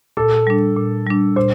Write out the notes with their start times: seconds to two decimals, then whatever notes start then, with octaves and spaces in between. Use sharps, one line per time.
0.17 A#2 A4
0.47 G3 D4
0.77 A#2
1.06 G3 D4
1.36 A#2 C5